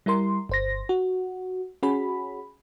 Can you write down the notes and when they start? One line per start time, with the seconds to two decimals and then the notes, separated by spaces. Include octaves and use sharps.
0.06 G3 E4 A#4 C6
0.49 G1 C5 A#6
0.89 F#4
1.83 C#4 F#4 G#4 B5